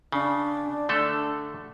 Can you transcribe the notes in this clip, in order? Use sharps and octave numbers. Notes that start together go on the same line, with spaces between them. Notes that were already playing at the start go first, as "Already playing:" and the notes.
C#3 D4
D3 A3 A4